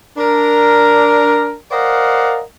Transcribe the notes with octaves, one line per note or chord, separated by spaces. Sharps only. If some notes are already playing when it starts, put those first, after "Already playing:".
D4 A#4
A#4 C5 D5 D#5 F5 F#5